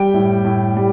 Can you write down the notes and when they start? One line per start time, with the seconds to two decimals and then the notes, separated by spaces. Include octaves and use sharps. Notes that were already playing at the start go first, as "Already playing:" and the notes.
Already playing: G3 G5
0.14 A2
0.45 A2
0.77 G3